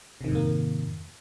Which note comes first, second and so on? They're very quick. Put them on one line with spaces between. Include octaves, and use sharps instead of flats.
C3 D#3 G#2 F2 A#3